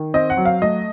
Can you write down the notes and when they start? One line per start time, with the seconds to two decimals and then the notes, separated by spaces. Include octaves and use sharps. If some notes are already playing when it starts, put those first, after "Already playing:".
Already playing: D#3
0.14 C4 D#5
0.30 F#5
0.37 F#3
0.45 F5
0.62 A3 D#5